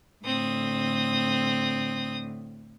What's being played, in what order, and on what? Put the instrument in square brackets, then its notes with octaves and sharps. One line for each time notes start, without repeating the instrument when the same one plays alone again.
[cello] A2 D3 [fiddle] C4 D#6